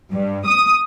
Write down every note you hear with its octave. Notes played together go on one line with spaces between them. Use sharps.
G2
D#6